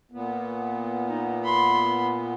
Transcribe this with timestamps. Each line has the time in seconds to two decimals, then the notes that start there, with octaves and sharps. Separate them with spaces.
0.12 A#2 B3
1.09 D#4
1.44 B5 C6